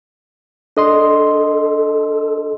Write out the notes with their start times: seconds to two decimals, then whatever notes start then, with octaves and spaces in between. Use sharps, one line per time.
0.77 D4 A4 D#5 C6